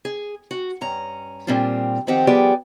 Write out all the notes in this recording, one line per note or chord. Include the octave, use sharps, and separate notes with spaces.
G#4
F#4
G2 C#4 A#5
A#2 G3 C4 D4 F4
D#3 F3 C4 G4 F#5
F3 G3 B3 G4 G#4 D5